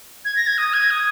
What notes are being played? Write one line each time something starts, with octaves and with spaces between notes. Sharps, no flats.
G#6
A#6
G#6
D#6
G#6
D#6